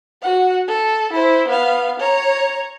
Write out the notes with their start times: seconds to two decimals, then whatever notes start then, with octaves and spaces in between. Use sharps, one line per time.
0.22 F#4 F#5
0.68 A4
1.12 E4 C5
1.48 B3 F5
1.99 C#5 A#5